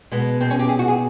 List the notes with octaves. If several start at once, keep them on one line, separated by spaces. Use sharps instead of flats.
B2 G#3 B3
C4
C#4
G4
G#4
F#4
G#4